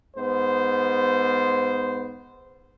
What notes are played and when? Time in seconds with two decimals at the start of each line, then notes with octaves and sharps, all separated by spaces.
0.16 G#2 B3 C5